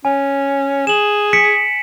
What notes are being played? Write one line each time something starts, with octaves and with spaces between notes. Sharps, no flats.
C#4 G#5
G#4 E7 F#7
B6 C#7 D7